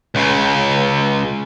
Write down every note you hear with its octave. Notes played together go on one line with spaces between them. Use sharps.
C#2 C#3